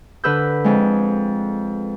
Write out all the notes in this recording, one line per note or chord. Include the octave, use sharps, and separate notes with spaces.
D3 B4 E6 G6
F2 G#3